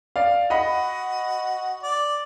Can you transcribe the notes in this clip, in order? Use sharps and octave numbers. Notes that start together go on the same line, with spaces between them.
D5 F5
F#4 D#5 F#5 B5
D5